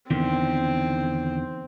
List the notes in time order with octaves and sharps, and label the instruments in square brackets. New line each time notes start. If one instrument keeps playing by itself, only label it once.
[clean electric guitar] E2 D3 D#3 [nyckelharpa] C4